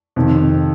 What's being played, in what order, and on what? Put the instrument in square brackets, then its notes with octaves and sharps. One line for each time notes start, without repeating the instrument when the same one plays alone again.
[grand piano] F2 C3 D#3